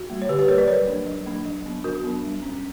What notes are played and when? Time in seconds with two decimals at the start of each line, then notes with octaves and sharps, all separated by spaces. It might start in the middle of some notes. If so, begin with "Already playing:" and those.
Already playing: F#4
0.10 G3 A#3
0.22 C#5
0.29 D3 G4 B4
0.39 G4 B4
0.48 G3 A#3 A#4 C#5
0.58 B4 D5
0.68 F#3 A#4 C#5
0.87 A#3 D4
1.07 F#3
1.26 A#3 D4
1.45 F#3
1.65 B3 D4
1.84 F#3 F#4 A#4
2.04 B3 D4
2.24 G3
2.43 C#4